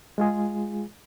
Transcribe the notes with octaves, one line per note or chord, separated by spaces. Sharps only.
G#3 F4 G#4